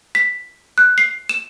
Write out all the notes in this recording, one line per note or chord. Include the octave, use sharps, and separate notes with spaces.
B6
F#6
C7
E7